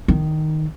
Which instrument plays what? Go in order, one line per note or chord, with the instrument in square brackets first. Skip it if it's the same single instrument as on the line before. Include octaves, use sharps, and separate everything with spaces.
[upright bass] D#3